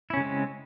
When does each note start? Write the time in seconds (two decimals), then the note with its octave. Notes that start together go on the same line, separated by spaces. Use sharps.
0.10 E4
0.14 C#4
0.17 C#3
0.20 G#3
0.23 C4